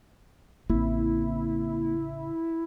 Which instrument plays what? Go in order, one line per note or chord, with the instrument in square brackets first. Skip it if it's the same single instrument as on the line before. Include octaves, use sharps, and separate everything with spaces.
[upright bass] A1 C#3 [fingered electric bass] A#3 C4 [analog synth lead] E4